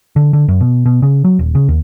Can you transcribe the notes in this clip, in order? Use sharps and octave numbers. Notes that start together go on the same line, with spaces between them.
D3
D3
F#2
B2
B2
C#3
F#3
D#1
C#3
D#2